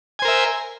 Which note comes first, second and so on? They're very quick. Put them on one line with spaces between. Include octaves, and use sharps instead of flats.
G#5 C5 A#4 E5